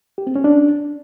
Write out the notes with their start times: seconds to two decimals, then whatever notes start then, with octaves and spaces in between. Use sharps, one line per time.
0.18 G4
0.27 C4
0.36 C#4
0.44 D4